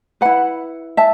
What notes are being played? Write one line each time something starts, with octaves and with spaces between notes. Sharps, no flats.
E4 B4 F#5 B5
E5 A5